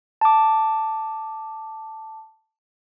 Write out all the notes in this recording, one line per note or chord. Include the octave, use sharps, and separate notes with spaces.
A5 D6